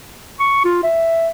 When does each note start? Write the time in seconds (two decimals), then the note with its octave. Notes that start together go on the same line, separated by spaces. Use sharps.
0.40 C#6
0.64 F4
0.83 E5